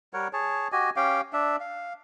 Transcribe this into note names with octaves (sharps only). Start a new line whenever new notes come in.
G3 A#4 C#5 F#5
G#4 C#5 A5
F#4 G4 D#5 G#5
C#4 G4 F5 G5
D4 E5
F5